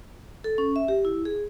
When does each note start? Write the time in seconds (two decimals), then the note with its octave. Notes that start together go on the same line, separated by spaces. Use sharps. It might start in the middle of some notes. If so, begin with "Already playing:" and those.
0.44 A4
0.58 C#4
0.76 E5
0.88 G4
1.05 E4
1.25 G#4